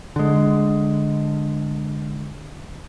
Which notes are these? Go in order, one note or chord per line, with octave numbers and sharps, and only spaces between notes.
D3 G#3